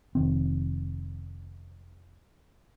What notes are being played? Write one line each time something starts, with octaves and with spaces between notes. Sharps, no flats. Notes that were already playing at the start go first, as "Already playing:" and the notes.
F1 D#3 C4